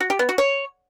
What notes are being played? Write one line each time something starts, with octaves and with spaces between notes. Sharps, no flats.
F#4
G4
B3
F#4
C#5